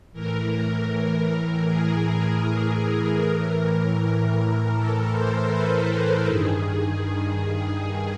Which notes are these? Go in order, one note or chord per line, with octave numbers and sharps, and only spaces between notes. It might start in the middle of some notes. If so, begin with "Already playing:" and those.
A2 E3 A#4
G#4
A2 E3 A#4
A4
C5
B4
A4
G2 D#3 G#4
G#4